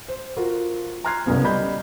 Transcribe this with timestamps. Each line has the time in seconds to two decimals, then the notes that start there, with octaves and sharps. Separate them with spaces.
0.08 C5
0.37 F4 F#4 A#4
1.05 A#5 C6 F6 F#6 G#6 C7
1.26 F#1 C2 F#2 C#3 B3
1.44 G3 D#5 B5 G6